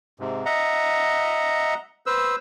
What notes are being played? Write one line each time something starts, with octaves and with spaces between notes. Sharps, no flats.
G#2 C3
D#5 E5 F#5 A#5
B4 C5 E6